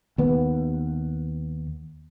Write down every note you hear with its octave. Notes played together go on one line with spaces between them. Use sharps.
D#2 B3